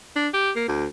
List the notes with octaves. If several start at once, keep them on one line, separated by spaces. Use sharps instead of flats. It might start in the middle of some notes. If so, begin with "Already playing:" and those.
D4
G4
A#3
D2